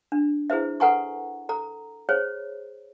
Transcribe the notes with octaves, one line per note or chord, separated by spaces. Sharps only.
D4
E4 G#4 B4 C5 E5
A4 B4 F#5 G#5 A#5 C#6
A4 A#5
G#4 C5 C#5